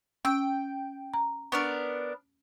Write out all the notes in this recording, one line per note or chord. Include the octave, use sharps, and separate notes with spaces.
C#4 G5 E6 G6
A#5
B3 D4 A#4 C#6